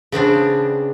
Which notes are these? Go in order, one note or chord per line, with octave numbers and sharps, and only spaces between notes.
C#3 B3 C4 D4